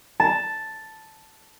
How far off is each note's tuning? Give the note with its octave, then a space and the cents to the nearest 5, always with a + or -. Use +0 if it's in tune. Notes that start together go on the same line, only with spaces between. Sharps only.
A5 +0